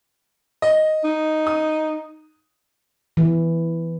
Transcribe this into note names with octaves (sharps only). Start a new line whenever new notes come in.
D#5
D#4
D#6
E3